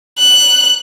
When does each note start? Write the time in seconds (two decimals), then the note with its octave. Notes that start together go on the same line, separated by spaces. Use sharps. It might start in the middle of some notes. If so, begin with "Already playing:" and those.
0.18 F#6